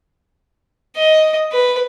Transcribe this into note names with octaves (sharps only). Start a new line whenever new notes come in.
D#5
B4